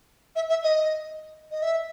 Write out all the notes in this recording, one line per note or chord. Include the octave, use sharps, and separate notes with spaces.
E5
E5
D#5
D#5
E5